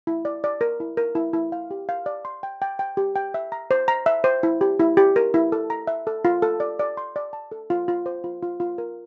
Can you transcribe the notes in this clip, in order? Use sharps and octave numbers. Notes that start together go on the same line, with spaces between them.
E4
D5
D5
A#4
E4
A#4
E4
E4
F5
G4
F5
D5
C6
G5
G5
G5
G4
G5
E5
A#5
C5
A#5
E5
C5
E4
G4
E4
G4
A#4
E4
A4
A#5
E5
A4
F4
A4
D5
D5
C6
D5
A5
A4
F4
F4
C5
F4
F4
F4
A#4